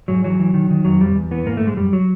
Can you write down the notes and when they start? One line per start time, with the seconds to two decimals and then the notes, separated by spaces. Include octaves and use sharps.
0.08 G#2 F#3
0.24 E3 F#3
0.39 E3
0.54 D#3
0.70 D#3
0.85 F2 F#3
1.01 F2 G3
1.16 E2
1.31 E3 B3
1.46 G#2 A#3
1.57 G#2 A3
1.67 G#3
1.77 F#2 G3
1.93 F#3